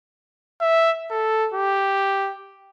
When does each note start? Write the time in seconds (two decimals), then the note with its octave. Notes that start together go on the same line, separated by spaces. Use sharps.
0.61 E5
1.11 A4
1.54 G4